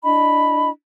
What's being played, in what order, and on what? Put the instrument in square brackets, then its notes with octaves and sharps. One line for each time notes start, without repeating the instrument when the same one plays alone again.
[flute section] D4 E4 D#5 B5